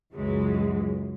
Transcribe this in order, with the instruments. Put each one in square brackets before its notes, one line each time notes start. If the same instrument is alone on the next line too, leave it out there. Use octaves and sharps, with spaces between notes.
[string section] C#2 F#2 E3 F#3 G#3